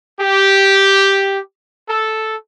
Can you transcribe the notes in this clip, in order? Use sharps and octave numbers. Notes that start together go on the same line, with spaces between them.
G4
A4